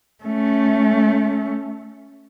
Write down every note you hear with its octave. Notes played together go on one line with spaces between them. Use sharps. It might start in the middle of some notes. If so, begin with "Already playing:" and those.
A3 C#4